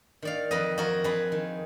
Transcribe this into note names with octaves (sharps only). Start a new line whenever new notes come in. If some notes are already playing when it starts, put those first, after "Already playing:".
D#3 D5 F5
F2 B4 D#5
F2 F#4 A#4
F2 G#4 B4
D#3